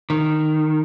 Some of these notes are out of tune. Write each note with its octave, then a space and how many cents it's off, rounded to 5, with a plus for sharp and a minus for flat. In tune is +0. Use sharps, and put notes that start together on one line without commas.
D#3 -10